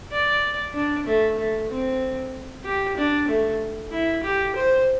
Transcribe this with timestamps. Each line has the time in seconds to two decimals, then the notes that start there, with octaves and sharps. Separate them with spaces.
0.12 D5
0.75 D4
1.06 A3
1.38 A3
1.70 C4
2.65 G4
2.97 D4
3.28 A3
3.92 E4
4.23 G4
4.56 C5